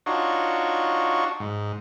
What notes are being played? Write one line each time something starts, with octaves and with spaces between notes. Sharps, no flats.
D4 D#4 F4 F#4 C#5
G#2